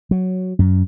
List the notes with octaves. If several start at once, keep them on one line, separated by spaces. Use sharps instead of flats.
F#3
F#2